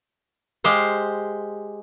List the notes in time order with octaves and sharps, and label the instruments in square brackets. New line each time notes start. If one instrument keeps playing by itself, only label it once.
[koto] G#3 G4 C5 F5